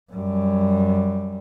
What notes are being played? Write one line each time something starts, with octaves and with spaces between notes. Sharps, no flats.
F#2 G3